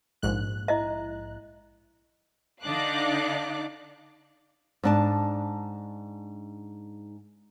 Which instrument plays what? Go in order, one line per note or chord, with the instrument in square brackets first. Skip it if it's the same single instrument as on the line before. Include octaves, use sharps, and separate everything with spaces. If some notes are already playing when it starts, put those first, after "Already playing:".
[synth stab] A#1 G#2 F#6
[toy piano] E4 D#5 E5
[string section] D3 D4 D#4 F5 D6 F#6
[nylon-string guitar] G#2 D4 A5